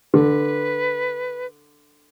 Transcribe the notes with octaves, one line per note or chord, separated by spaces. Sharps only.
D3 B4